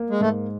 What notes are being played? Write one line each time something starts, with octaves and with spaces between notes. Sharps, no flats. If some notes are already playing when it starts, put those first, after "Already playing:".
Already playing: A#3
G#3
G#2 A3